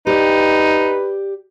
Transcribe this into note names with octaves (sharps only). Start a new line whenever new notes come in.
D#4 G4 B4 D5